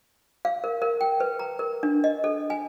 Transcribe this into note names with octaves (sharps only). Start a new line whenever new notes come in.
F5
A#4
A#4
G5
B4
A#5
A#4
D4
D#5
A4
G#5